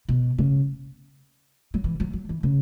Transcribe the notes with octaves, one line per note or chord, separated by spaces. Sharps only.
B2
C#3
F#3
E3
F#3
F#3
E3
C#3